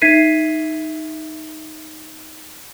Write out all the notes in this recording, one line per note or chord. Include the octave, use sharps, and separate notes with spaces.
D#4 E5 G#6 B6 C7 D#7